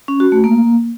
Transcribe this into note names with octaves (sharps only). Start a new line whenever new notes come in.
C#4
F#4
A3
A#3